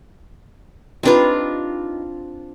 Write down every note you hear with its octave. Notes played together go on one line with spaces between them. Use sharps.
C4 D4 D#4 F4 G4 B4